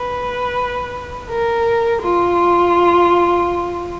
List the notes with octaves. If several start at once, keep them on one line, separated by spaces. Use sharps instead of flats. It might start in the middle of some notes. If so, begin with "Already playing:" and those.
Already playing: B4
A#4
F4